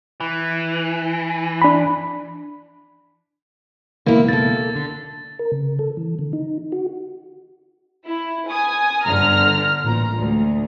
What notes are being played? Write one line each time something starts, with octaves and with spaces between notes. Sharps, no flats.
E3
D4 B5
C#2 B2 A#3 B3 E4
A#3 A4 A6
D3
A#4
C#3
A4
E3
D3
D#4
F#4
E4
G#5 D#6
G1 D3 A#5 F6
A1 A#2 A#5
D2